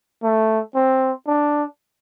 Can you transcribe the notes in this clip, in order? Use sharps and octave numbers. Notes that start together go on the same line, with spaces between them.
A3
C4
D4